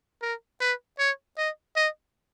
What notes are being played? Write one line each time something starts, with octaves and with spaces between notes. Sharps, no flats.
A#4
B4
C#5
D#5
D#5